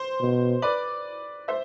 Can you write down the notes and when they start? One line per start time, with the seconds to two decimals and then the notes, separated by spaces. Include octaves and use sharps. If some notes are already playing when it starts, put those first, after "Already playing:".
Already playing: C5
0.20 B2
0.62 B4 D5
1.48 C5 E5